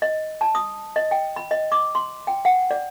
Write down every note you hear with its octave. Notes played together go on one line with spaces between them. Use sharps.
D#5
A5
D#6
D#5
G5
B5
D#5
D6
C6
G5
F#5
D5